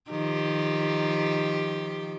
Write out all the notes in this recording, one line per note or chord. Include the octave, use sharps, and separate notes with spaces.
D#3 F3 G4